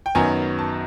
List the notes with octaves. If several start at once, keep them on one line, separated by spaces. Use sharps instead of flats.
G5
F#2 D#3 F#3 B3 G#5
A5